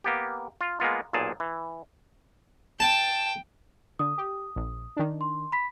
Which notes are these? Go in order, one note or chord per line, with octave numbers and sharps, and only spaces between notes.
A#3 B3 G4
F4
G#3 A#3 B3 F4
B1 A#2 G#4 A5
E3
G5 A5
D3 D#6
G4
A#1
D#3 D4
C6
B5 B6